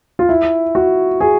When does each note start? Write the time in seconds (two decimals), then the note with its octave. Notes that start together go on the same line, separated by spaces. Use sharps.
0.19 F4
0.29 E4
0.75 F#4
1.21 G#4